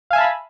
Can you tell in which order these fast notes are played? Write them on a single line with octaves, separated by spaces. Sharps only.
F5 G#5 E5 A5 B5